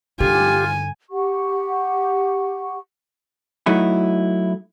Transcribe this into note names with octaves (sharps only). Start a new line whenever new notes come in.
G2 D3 F4 G4 G#5
G4 F#5 C#6
F#3 A3 D#4 E4